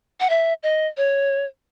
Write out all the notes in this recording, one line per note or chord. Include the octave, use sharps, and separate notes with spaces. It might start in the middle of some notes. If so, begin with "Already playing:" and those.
F#5
E5
D#5
C#5